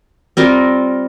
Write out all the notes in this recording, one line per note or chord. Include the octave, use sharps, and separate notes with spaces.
G3 C4 F4 A#4